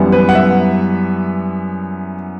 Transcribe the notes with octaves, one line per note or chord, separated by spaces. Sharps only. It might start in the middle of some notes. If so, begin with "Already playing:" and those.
Already playing: F#2 E3 G3 B3
B4
F#5
E5